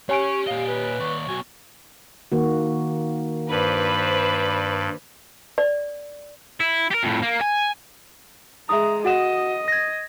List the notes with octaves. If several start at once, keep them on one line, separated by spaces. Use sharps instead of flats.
C#4 G4 C#5 G#5 C#6 D7
A#2 D#5 F5
B4
D#2 D5 C#6
B1 F#4 G#5
D#3 A#3 F#4
G2 B4 C5 D5
D5
E4
G4 A#4
F2 A2
A#3
G#5
G#3 E5 A#5 D#6
F#4 D#5 F#5 E7
G#6 A#6